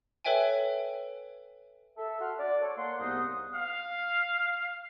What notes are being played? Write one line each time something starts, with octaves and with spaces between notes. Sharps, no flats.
A4 B4 C#5 E5 G5 G#5
A4 E5
F#4 F#5 C6 F6
D5
A4 C#5
A#3 F#5 C6
C2 G#2 B3 D#4 F#5 D#6
F5